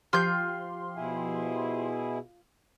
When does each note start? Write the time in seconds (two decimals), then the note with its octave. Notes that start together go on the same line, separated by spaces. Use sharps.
0.13 F3 F4 G4 C6 G6
0.95 B2 E4 G#4